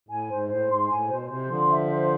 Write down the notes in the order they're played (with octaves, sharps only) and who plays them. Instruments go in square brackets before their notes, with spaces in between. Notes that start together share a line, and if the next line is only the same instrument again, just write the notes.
[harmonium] A2 [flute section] G#5
[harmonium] G#2 [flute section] C5
[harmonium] A2 [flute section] C5
[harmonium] G#2 [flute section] C6
[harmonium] A2 [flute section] G#5
[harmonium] B2 [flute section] C5
[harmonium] C3 [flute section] C5
[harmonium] D3 F3 [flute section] C6
[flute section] E5
C5